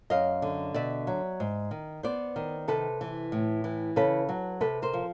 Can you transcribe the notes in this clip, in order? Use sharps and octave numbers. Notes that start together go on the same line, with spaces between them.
F#2 D#5 F5
D3
B2 D5 E5
F#3
G#2
D#3
B3 C5 D5
D#3
C3 A4 B4
E3
A2
E3
C#3 A4 B4
F#3
C3 A4 B4
A#4 C5
F3